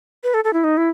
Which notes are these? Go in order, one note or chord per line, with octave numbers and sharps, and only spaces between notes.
B4
A4
A4
E4
D#4
E4